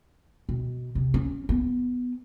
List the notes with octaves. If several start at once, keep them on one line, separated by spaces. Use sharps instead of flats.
B2
C3
C#4
B3